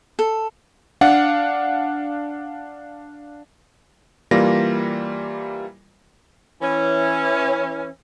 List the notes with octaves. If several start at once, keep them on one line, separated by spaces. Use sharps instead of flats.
A4
D4 F5 F#5
E3 G3 A#3 F4 A#6
E3 C#4